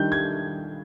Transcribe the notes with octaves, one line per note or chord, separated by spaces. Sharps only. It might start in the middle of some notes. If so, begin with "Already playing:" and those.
Already playing: D#3 G3 D4 G6
G#6